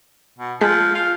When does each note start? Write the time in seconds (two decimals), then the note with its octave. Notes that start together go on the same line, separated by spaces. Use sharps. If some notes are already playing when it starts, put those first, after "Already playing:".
0.38 B2
0.61 F3 G#3 A5 B6
0.94 F4